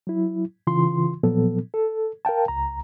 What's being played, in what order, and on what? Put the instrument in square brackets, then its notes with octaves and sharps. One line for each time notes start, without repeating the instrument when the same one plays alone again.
[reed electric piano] F#3 E4
C#3 E3 F4 C6
A#2 F3 F#3 B3 A4
A4
A#4 F5 G5 A5
C#2 A#5